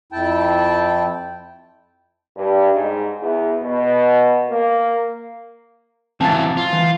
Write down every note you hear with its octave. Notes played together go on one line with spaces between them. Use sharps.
F2 E4 G5 A5
G2
G#2
E2
B2
A#3
E3 F#3 C4 F5 A5 A6
F4
E3